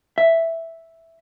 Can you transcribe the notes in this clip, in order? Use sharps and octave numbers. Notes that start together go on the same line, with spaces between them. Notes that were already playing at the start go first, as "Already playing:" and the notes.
E5